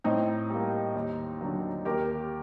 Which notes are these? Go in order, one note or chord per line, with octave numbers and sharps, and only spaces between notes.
A2 C4 D#4
G3 A#3
D#2
D3 F#3
D#2 G4 A#4